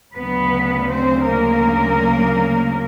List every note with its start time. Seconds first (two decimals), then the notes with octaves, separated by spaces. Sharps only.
0.15 D2 C#3 F#3 B3 B4
0.90 C4 C5
1.27 A#3 A#4